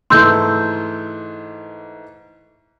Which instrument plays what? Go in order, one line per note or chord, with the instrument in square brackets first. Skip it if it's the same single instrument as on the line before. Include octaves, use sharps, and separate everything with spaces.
[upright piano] G#2 E3 A3 [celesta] C6 E6 G6